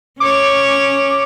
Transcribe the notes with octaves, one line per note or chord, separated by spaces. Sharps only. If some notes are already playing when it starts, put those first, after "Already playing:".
C#4 C#5 D6